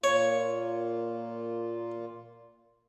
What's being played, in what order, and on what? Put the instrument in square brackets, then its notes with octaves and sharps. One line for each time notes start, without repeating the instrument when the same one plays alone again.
[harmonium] A#2 A#3 F4 [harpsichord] C#5